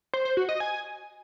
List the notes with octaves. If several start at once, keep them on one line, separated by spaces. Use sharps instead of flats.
C5
C5
F#4
D#5
G#5